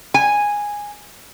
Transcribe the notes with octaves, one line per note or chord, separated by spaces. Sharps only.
G#5